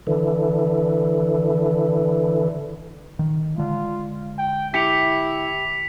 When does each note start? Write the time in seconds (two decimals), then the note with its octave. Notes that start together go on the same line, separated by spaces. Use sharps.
0.07 D3 E3
3.19 D#3
3.58 D3 G#3 F4
4.38 G5
4.74 E4 G4 B6 C#7 F7